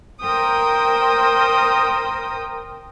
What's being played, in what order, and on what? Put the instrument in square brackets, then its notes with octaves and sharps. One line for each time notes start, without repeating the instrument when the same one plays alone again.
[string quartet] A#4 C5 G5 D#6